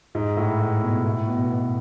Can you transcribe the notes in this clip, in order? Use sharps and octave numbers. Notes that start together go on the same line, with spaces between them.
G#2
A2
A2
B2
A2
B2
B2